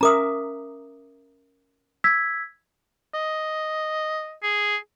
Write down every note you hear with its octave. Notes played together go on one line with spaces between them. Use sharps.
C#4 A#4 E5 A#5 D6 D#6
E6 G#6 B6
D#5
G#4